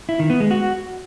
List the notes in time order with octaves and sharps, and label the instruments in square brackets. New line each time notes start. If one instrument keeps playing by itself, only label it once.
[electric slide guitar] E4
D#3
B3
G#3
F#4